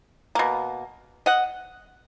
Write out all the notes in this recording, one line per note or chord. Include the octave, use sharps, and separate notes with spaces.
B2 A#3
D#5 F#5